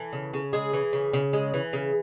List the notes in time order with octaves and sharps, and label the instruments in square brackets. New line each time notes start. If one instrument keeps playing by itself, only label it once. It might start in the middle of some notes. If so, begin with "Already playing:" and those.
Already playing: [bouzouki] E3 A4
C#3
C#3
G#3 G#4
E3
C#3
C#3
G#3
E3
C#3